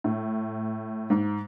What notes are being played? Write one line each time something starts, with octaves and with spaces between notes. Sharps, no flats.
A2
G#2